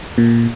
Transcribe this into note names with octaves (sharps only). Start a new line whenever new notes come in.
A#2